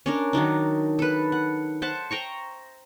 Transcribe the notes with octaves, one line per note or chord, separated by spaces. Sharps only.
C#4 D4 A#4
D#3 F#3 D4 D#4
A4 B4
F#5
C5 E5 F#5 A5
C5 G5 A#5 C#6